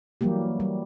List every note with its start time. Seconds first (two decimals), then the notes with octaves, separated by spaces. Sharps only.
0.21 E3 F#3 G3 A#3 G4
0.60 G3